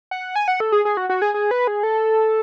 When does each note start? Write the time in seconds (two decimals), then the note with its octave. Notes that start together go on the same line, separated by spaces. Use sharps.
0.11 F#5
0.36 G#5
0.48 F#5
0.60 A4
0.72 G#4
0.85 G#4
0.97 F#4
1.10 F#4
1.22 G#4
1.34 G#4
1.51 B4
1.67 G#4
1.83 A4